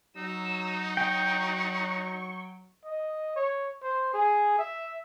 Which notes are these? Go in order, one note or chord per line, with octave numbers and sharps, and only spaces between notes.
F#3 D#4 E6
G5 C#6
D#5
C#5
C5
G#4
E5